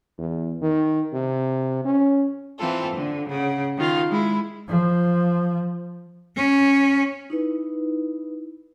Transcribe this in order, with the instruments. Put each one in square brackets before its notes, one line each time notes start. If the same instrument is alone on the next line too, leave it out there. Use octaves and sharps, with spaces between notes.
[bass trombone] E2
D#3
C3
C#4
[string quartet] E3 C4 F4 A4
D3
C#3 F#5
D#3 F4 F5 C6
G#3 E4
[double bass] F3
[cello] C#4
[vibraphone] D#4 E4 B4